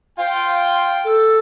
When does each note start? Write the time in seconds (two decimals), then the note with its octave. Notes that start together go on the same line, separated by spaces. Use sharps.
0.18 F4 C5 F5 G5
1.05 A4